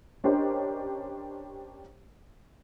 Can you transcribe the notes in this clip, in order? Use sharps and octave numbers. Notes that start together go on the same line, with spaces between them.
C#4 D4 G4 A#4 C5 D#5